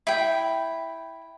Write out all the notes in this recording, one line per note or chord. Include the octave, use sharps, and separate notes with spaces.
E4 G5